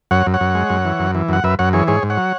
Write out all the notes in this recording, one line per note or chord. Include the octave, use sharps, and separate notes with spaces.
F#2 C#5 F#5
F#2
C#5 F#5
F#2
G#3
F#2
E3
F#2
E3
F#2 F#5
F#2 B4 E5
F#2 C#5 F#5
E3 G#4 C#5
G#2 G#4 C#5
G#2
C#5 F#5
F#3